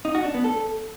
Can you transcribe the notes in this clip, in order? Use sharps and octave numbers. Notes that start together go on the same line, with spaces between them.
D#4
F#4
D4
B3
A4